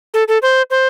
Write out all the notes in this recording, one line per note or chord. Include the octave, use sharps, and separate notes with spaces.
A4
A4
C5
C5